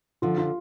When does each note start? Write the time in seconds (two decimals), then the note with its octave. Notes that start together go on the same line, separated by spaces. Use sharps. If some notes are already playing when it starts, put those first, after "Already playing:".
0.22 D3 F3 F4
0.38 F4